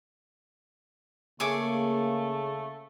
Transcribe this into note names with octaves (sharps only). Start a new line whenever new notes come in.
C#3 A3 A#3 G#4 C#5 D6